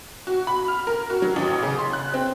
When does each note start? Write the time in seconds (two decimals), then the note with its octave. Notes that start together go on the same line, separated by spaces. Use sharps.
0.27 F#4
0.47 B5
0.68 F6
0.87 A#4
1.10 F#4
1.22 F#3
1.36 A1
1.63 C#3
1.79 C6
1.93 F#6
2.14 C4